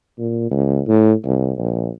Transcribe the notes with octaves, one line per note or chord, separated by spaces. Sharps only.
A#2
C#2
A2
C2
A#1